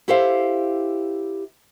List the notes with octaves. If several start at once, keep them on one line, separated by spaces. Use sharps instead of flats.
E4 G4 A4 C5 E5 F5